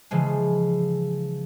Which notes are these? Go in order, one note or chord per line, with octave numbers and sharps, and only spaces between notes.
C#3 E3 F3 G#3